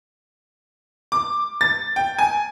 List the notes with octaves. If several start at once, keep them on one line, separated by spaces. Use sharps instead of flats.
D6
A6
G5
G#5